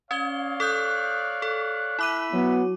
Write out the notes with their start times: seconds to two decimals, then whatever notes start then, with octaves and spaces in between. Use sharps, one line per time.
0.11 C#4 C#5 D5 F5 G#6 G7
0.60 A4 D#6 F#6 G6
1.42 A4
1.99 E4 E5 B5 D6 D#7
2.32 F#3 B3